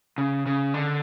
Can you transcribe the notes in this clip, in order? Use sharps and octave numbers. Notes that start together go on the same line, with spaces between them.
C#3
C#3
D3